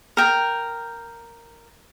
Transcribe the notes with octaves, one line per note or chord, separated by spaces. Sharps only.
A#4 G5